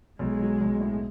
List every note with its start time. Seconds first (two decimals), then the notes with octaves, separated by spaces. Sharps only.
0.19 B1 G#3
0.40 F#3
0.60 B1
0.80 A2